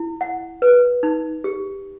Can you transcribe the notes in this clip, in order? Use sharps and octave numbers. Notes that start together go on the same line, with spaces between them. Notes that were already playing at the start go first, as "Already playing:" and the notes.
Already playing: E4
F#5
B4
D#4
G4